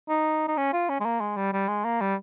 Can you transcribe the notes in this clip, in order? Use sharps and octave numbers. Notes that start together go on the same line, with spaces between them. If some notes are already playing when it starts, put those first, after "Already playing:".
D#4
D#4
C#4
F4
C#4
G#3
A#3
G#3
G3
G3
G#3
A#3
G3